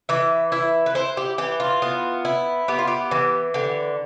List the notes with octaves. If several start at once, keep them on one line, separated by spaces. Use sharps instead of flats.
E3 E5
E4 E5
B4
E4 C5
G4
E3 G4
F4
B3
E4
B3 G4
F4
G4
E3
D3 G4